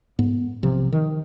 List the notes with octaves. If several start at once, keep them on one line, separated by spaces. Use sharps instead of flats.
G#2 B3
B1 C3 F3
D#3